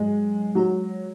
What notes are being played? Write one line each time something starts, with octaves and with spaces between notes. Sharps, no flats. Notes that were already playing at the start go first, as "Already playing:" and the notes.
Already playing: G#2 F#3 G#3
F#3 G#3 F#4 C#5